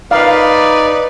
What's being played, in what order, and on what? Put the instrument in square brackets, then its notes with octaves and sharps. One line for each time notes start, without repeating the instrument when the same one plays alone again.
[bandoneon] D#4 D5 [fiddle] B4 [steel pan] F5